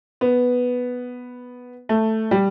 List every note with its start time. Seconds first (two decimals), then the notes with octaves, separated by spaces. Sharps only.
0.21 B3
1.89 A3
2.31 G3